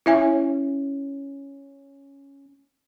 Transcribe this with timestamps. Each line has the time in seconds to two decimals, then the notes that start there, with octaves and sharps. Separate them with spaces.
0.06 C#4 E4 E5 G#5